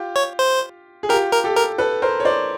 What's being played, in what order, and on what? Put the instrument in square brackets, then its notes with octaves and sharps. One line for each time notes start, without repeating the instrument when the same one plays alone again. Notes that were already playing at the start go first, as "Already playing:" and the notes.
Already playing: [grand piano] F4 G4
[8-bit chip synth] C#5
C5
[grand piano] G#4
[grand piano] F4 G4 [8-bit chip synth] A#4
[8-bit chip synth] A#4
[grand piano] G4 A4
[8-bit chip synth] A#4
[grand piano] A4 B4
A#4 C5
C#5
C5 D5